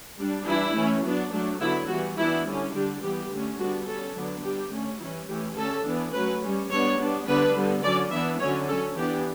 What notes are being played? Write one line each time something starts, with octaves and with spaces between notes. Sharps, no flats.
G3 D4
E3 G3 D4 E4
E3 A3 C#4
F#3 B3 D4
F#3 A3 D4
D3 F#3 B3 E4
E3 G3 B3 F#4
E3 B3 D4 E4
D3 G3 C#4
D3 G3 D4 G4
E3 G3 B3 G4
D3 A3 C#4
D3 G3 B3 D4 F#4
G3 C#4 A4
D3 F#3 B3 D4
G3 D4 G4
D3 A3 C#4
E3 G3 C#4 E4
E3 A3 C#4 G4
D3 A3 C#4 A4
E3 B3 D4
F#3 A3 C#4 B4
G3 C#4
G3 B3 D4 C#5
G3 B3 D4
D3 G3 B3 D4 B4
D3 G3 B3
D3 F#3 C#4 D5
E3 B3 D4 E5
D3 F#3 C#4 C#5
F#3 C#4 A4
E3 B3 D4 G4